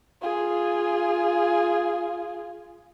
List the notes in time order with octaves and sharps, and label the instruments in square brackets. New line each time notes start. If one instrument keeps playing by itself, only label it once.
[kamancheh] F4 G#4